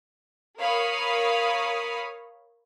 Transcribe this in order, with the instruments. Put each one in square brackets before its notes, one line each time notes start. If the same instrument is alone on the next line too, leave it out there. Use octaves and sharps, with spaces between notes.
[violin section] A#4 C#5 F5 B5 D#6